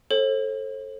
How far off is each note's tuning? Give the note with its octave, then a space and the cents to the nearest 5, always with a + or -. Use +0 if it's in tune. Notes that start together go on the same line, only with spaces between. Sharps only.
A4 +0 C5 +45